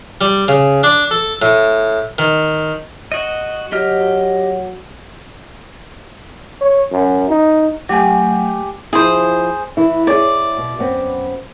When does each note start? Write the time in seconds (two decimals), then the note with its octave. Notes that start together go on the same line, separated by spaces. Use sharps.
0.21 G3
0.48 C#3
0.83 D4
1.11 A4
1.42 A2
2.19 D#3
3.12 F#4 D#5
3.72 F#3 G4 D#5 F6
6.61 C#5
6.92 F#2
7.29 D#4
7.89 F#3 A3 G4 G#5
8.93 F3 E4 G#4 C5
9.77 E3 E4
10.07 E4 G#4 C#5 D5
10.58 B2
10.79 F#2 B3 C4